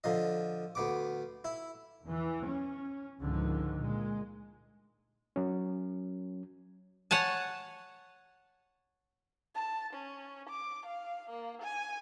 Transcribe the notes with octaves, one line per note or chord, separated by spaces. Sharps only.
D3 F3 D#5
D2 B3 D6
E4
E2 E3
C#4
C#2 G#2 D3 D#3 F3
A#2 G#3
F#3 C#4
C#5 F#5 G#5 A5
A5
C#4
D6
F5
A#3
G#5